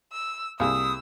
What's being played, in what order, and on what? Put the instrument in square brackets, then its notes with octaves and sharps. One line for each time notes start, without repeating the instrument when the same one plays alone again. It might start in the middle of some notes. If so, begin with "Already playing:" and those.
[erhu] E6
[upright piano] C2 [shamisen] A#3 G#4 [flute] D#6 [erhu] E6